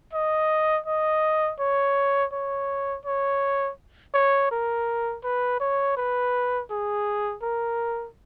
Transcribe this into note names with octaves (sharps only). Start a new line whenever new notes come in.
D#5
D#5
C#5
C#5
C#5
C#5
A#4
B4
C#5
B4
G#4
A#4